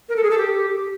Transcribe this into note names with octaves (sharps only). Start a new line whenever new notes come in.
A#4
A4
G#4
A4
G4